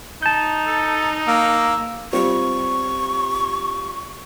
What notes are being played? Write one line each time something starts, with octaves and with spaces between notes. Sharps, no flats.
D#4 A5 G6
A4
A#3 E6
G3 C4 F4 C#6